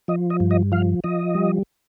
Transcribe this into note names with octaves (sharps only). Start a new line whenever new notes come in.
F3 D#5
D#5
G2
D#5
F3 F5
F3 D#5
G3